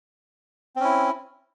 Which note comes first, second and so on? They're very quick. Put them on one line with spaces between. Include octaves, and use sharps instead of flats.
C4 C#4 E4